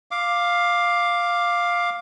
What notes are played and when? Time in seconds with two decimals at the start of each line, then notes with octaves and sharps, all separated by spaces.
0.11 F5 D6